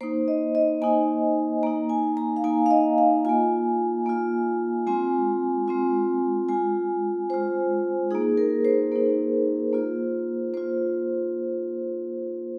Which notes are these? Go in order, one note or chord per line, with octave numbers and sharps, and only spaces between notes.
A#3 D#4 C5
D#5
D#5
A#3 D#4 G#5
A#3 D#4 A#5
G#5
A#5
F5
A#3 D#4 G#5
F5
D#5
F5
A#3 F4 G#5
A#3 F4
G#3 C4 F4 G#5
G#3 C4 F4
G#3 F4 G#5
G#3 F4 C5
A#3 D#4 G#4
A#4
C5
A#3 D#4
A#3 F4
A#3 F4 C5